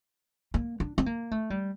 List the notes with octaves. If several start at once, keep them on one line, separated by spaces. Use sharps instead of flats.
A#3
D4
C4
A#3
A3
G3